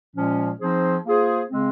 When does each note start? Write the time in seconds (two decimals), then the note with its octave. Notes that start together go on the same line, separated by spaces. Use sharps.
0.14 A#2 F3 G#3 C#4
0.59 F3 C4 D#4 G#4 C5
1.05 A#3 F4 G#4 C5
1.50 C#3 G#3 C4